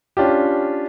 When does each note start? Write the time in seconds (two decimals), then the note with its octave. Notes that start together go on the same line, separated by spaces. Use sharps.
0.17 C#4 D4 F4 G4